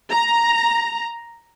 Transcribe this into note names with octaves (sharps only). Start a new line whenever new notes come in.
A#5